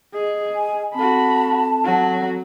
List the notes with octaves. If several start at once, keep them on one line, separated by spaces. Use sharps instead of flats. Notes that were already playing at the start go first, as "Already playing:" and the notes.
G#4 D#5
G#5
C4 F#4 A4 A5 B5
F#3 F#4